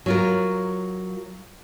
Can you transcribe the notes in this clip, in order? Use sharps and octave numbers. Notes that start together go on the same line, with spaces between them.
F#3 F4 A#4